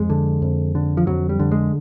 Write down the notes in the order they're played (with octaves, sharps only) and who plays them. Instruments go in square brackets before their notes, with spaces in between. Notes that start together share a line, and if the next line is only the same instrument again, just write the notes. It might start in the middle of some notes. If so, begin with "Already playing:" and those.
Already playing: [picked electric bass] F2 G#3
D3
F2
D3
F3
F2 F#3
G3
D3
G#3